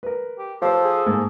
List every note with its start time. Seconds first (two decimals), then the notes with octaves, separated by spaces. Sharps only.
0.03 A#4 B4
0.38 G4
0.62 F3 G4 A4 C5
0.83 G#4
1.07 G#2 A#3